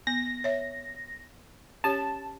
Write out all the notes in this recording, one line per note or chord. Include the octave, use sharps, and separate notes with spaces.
B3 A#6
C#5 E5
C#4 G4 C#5 A5